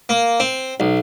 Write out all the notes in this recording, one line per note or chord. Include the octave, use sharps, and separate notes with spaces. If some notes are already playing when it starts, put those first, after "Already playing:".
A#3
C4
B1